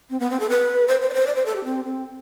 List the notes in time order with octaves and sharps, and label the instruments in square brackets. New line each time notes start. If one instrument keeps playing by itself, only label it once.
[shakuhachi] C4
B3
C4
A4
B4
C5
C5
D5
C5
D5
C5
A4
G4
C4
C4